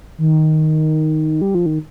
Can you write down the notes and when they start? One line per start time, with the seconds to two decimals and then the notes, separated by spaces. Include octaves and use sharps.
0.18 D#3
1.41 G3
1.55 F3
1.66 D#3